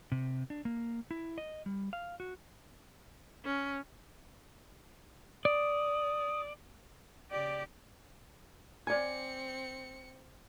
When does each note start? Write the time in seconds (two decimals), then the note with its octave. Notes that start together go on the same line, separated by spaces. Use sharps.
0.12 C3
0.50 D4
0.65 A#3
1.11 E4
1.38 D#5
1.66 G3
1.93 F5
2.20 F#4
3.45 C#4
5.45 D5 D#6
7.31 C#3 G4 D5
8.87 C4 D5 G#5 C#7